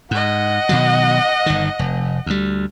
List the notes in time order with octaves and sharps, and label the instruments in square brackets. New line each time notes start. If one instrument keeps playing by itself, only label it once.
[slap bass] G#2 [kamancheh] D#5 F#5
[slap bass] B2 D#3 F#3
G1 D#3
F1
D2 G3